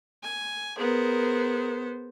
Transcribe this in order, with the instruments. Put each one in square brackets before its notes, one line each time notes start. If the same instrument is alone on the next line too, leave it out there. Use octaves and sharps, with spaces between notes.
[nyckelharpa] G#5
[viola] B3 C5 [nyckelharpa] G#4 A#4